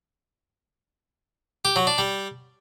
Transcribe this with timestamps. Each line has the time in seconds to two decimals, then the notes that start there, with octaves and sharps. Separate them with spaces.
1.65 G4
1.76 F#3
1.87 D4
1.98 G3